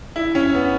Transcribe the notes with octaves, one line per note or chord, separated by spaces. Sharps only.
E4
C#4
B3